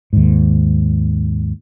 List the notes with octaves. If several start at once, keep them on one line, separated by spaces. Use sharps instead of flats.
D#2 G#2